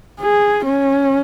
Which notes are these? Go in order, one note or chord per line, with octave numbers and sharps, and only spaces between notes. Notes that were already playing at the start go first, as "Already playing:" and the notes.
G#4
C#4